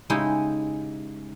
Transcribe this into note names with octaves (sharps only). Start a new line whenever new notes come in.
C#3 G#3 D#4 E4 G4